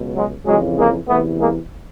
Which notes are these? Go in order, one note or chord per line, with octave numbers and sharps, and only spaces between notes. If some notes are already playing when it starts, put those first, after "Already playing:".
Already playing: C#2 B2
F#3 G#3
F2 C#3 E3 F#3 G#3
G#3 A#3
E2 C3 E3 A3 B3
G#3 A#3